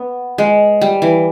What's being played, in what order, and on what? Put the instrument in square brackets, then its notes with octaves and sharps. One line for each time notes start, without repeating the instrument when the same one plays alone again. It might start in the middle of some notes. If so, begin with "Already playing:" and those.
Already playing: [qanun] B3
G#3
G3
E3